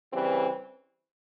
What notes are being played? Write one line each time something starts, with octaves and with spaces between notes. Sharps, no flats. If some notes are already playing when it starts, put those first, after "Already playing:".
C#3 E3 G3 C4